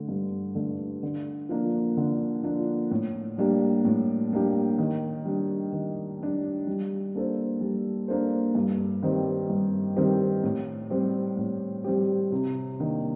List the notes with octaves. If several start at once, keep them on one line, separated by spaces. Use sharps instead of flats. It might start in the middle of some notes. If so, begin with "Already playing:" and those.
Already playing: D3 A3
G2
D3 A3
D3
F3 A#3 D4
D3
F3 A#3 D4
A2
G3 A#3 D4 G4
A2
G3 A#3 D4 G4
D#3
G3 D4
D#3
G3 D4
G3
A#3 D4 A4 C5
G3
A#3 D4 A4 C5
G2
D#3 G3 C4 G4
G2
D#3 G3 C4 G4
A2
G3 C4 G4
A2
G3 C4 G4
C3
D#3 A#3 D4